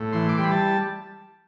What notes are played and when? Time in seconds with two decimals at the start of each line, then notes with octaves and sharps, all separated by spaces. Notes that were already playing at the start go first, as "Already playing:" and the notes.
Already playing: A2
0.13 E3 C6
0.29 D6
0.37 G3 C6
0.44 B5
0.51 A5